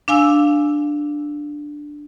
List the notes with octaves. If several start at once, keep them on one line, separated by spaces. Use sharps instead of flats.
D4 F5 G#5 E6